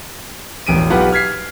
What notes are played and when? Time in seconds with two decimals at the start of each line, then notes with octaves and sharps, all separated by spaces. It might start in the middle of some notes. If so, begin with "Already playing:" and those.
0.67 E1 A1 D7 D#7
0.90 B1 F4 G4 B4 F#5
1.12 F6 G#6 B6 C7